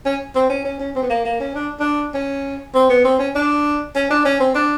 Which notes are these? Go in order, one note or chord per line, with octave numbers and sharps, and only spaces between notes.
C#4
C4
C#4
C#4
C#4
C4
B3
A#3
A#3
C#4
D4
D4
C#4
C4
B3
C4
C#4
D4
C#4
D4
C#4
C4
D4